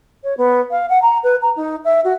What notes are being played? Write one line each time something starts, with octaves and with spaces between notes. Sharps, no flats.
C#5
B3
F5
F#5
A#5
B4
A#5
D#4
E5
F#4